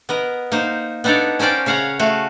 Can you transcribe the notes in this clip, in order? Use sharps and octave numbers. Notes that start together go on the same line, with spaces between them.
B3 A#4 D#5
A#3 D#4 C5
B3 D4 D#4 A4 C#5 D5
C#4 A#4 C5 D5 G5
C#3 C#5 F5 F#5 A#5
A3 F#4 F5